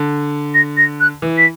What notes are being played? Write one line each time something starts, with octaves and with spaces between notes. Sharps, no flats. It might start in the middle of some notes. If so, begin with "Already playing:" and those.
Already playing: D3
A#6
A#6
F#6
E3
B6